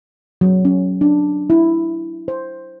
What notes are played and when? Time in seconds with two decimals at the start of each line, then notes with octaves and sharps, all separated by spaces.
0.41 F#3
0.65 C#4
1.01 D4
1.50 E4
2.28 C5